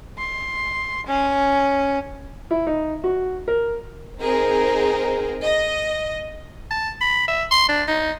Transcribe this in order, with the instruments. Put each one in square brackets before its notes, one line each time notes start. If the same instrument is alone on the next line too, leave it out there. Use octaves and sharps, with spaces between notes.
[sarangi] C6
C#4
[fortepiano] E4
D#4
F#4
A#4
[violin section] C4 D#4 G#4 A#4 C5
D#5
[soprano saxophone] A5
B5
E5
C6
D4
D#4